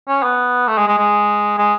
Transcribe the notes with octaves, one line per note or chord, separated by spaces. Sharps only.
C#4
B3
A3
G#3
G#3
G#3
G#3